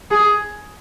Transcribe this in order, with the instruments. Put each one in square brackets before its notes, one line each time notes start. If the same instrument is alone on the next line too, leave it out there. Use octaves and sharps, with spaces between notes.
[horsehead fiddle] G#4